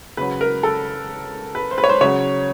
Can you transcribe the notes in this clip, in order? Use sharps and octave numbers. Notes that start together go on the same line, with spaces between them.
C#3 F#3 B4
A#4
A4
B4
C5
B4
C#5
C5
C#3 F#3 C#5